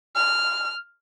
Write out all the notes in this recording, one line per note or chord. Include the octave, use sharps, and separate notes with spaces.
F6